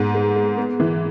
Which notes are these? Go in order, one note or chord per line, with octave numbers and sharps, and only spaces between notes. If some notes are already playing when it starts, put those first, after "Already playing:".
Already playing: G#2 B3
G#3
G#3
B3
E3